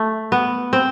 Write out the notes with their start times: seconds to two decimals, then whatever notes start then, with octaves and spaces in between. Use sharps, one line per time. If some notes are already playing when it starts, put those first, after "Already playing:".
Already playing: A3
0.32 B3
0.73 C4